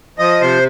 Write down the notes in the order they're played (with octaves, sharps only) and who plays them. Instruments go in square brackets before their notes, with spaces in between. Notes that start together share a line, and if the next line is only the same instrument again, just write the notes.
[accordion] F3 D#5
C3 C5